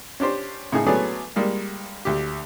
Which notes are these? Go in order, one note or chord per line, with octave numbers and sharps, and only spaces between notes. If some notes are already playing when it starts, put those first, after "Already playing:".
C#4 D4 G4 C5
A2 C#3 D#4 G#4
F#3 A3 B3 C#4 G#4 D5
G3 G#3 A#3
D2 G4